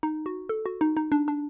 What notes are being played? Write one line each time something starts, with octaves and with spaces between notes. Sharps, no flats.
D#4
F#4
A4
F#4
D#4
D#4
D4
D4